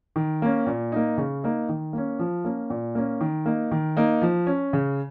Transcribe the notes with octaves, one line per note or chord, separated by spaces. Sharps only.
D#3
A#3 C#4
A#2
A#3 D#4
C#3
A#3 D#4
D#3
A#3 C#4
F3
A#3 C#4
A#2
A#3 C#4
D#3
A#3 D#4
D#3
A#3 D#4
F3
C#4
C#3